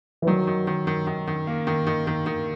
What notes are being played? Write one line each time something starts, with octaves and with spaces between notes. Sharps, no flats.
E3
D#3 F#3
D#3
D#3
D#3
D#3
D#3
A#3
D#3
D#3
D#3
D#3